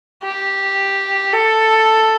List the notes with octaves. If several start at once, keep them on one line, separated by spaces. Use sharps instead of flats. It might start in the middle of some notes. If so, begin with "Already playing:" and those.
G4
A4